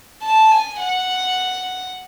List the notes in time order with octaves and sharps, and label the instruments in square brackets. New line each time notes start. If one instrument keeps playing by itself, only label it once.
[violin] A5
G#5
F#5